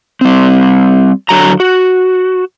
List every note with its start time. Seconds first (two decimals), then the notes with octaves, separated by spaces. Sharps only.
0.21 G3 C4
1.29 D3 F#3 A#5
1.60 F#4